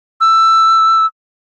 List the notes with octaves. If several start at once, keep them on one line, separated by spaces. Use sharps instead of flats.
E6